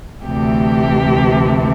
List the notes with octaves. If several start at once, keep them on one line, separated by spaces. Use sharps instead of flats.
D2 C3 E3 A3 G4